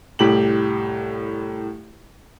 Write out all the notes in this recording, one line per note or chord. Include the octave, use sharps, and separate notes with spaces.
C2 A2 G4 F#7